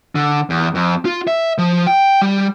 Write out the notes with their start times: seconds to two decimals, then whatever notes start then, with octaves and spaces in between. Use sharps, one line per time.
0.15 D3
0.50 E2
0.75 F2
1.05 F4
1.27 E5
1.58 F3
1.87 G5
2.21 G3